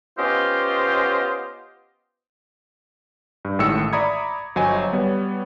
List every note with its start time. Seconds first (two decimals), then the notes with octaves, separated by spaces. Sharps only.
0.18 B3 C#4 F4 G4 C5 D#5
3.45 G2
3.59 A1 A2 D#3 G#3 E6 C#7
3.93 D5 E5 A#5 B5 D#6 G#6
4.56 G1 F#3 C5 D#5 G#5
4.93 G3 B3 C#5